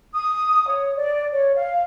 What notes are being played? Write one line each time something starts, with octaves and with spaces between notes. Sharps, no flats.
D#6
C#5
D5
C#5
F5